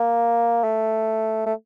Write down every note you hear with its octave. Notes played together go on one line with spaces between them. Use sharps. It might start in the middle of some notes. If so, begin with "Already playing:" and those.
Already playing: A#3
A3
A3